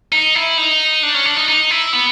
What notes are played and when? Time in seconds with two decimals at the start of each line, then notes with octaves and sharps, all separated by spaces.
0.12 D#4
0.35 E4
0.58 D#4
1.03 D4
1.14 C#4
1.25 D4
1.37 D#4
1.48 D#4
1.71 E4
1.93 B3